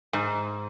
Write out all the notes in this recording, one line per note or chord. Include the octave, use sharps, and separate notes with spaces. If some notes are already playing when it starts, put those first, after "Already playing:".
G#2